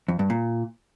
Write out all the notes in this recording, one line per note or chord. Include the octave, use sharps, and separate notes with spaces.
F2
G2
A#2